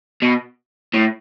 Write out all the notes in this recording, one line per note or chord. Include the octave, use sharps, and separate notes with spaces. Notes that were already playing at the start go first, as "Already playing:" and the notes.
B2
A2